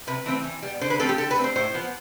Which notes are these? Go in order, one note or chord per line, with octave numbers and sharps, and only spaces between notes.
C3 B4
E3 A3 C4
E3
G3 B3
D3 C5
B4
F3 A3 C4 A4
G4
D3 A4
B4
A3 C4
C5
A2 C5
F3 B3